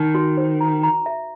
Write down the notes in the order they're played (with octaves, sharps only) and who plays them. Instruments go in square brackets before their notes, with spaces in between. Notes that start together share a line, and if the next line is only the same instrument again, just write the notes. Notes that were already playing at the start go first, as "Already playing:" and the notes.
Already playing: [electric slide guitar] D#3 [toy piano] D#4
[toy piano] F#4
C5
A#5
A#5
E5